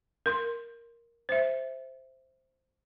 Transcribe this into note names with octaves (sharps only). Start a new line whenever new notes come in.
A#4 C6
C5 E5